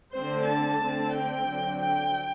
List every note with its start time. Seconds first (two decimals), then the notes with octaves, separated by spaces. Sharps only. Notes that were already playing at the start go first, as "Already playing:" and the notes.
0.15 D3 A3 C4 C5
0.50 A5
0.82 D3 A3 C4
1.16 G5
1.49 D3 F#3 C4
1.82 G5